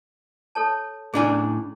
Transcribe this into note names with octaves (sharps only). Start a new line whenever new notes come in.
A4 C#5 A5
A2 C#4 D4 E4 G#4 G#5